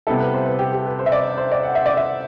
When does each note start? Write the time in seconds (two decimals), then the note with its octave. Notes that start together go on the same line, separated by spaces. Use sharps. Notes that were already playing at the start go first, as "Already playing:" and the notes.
0.07 C3 G3 B3 E4 A4
0.20 B4
0.34 C5
0.46 B4
0.59 G4
0.73 G4
0.86 B4
0.99 C5
1.06 E5
1.12 D5
1.38 C5
1.52 D5
1.63 F#5
1.75 E5
1.86 D5
1.97 E5